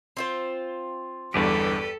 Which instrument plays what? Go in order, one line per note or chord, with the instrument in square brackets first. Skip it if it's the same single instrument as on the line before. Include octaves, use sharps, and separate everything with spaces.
[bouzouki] C4 F4 C5
[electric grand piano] G1 E2 G2 [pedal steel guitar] G4 B4 D5 [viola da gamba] A4